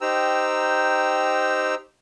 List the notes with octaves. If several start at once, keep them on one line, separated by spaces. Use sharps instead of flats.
D#4 G4 C5 G5 A#5 E6